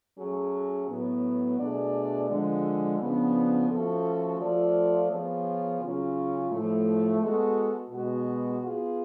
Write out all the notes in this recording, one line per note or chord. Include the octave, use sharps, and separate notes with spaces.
F#3 A3 C#4 G#4
A2 F#3 B3
B2 A3 D4 G#4 D5
D3 F3 G#3
C#3 F3 B3 D4
F3 A3 C#4 F#4 A4
F3 A3 F4 A4 D5
F3 B3 F4 G#4 C#5
C#3 F#3 C#4 F4 G#4
A2 F3 A3
G#3 B3 F#4 A4
B2 G#3 B3 F#4
B3 F4 G#4